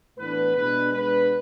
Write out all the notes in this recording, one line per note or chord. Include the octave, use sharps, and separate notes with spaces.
A2 E3 B3 D4 B4
B2 G#3 D4 B4
B2 G#3 B3 D4 B4